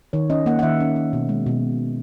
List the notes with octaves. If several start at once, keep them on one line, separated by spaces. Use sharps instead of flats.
D#3 C#5
C#4 D#5
A#3 F#5
F#5
D#3 E5
C#4
C#4
B2
G#3
B2